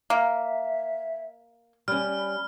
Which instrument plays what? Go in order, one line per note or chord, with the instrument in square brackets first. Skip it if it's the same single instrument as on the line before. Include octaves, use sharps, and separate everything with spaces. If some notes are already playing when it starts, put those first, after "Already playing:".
[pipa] A#3 [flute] E5
[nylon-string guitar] G3 C#4 [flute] B5 [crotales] F6